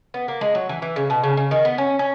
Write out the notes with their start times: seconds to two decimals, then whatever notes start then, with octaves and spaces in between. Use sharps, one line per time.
0.14 B3
0.28 A#3
0.41 G#3
0.55 F#3
0.69 E3
0.82 E3
0.96 C#3
1.10 B2
1.23 C#3
1.37 C#3
1.51 D#3
1.65 B3
1.78 C#4
1.99 C#4